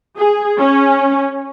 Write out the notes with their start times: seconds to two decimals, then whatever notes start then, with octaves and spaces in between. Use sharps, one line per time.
0.18 G#4
0.59 C#4